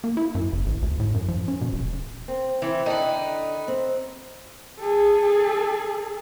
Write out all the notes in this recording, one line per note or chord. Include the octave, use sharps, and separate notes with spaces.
A#3
E4
F#2
F#1
A1
D2
A2
F#2
F3
C#4
B2
D#1
C4
E3 C4 E4
D3 D#4 A4 B4 G5
C4
G#4 A4